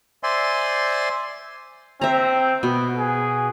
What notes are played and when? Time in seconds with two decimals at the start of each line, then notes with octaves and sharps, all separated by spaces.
0.23 C5 D5 E5 G#5 C6
2.01 C4 E5 A#5
2.63 B2 B3
2.97 G#4